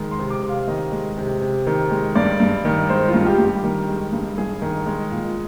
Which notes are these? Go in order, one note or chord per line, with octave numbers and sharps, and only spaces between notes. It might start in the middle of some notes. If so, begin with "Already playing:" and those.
Already playing: D#3 G#3
C6
C3
D6
C3
F5
D#3 D#5
G#3
C3
C3
D#3
G#3
G2 D5
G2
D#3
G#3 C5
F4
G2
G4
G2
G4
D#3
G#3
G2
G2 G#4
D#3
G#3
A#2